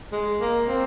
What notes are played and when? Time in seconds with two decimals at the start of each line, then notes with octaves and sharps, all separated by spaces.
0.13 G#3
0.41 A#3
0.68 C4